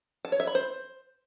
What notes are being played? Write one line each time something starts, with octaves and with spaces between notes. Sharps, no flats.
A5
C#5
E5
B5
C5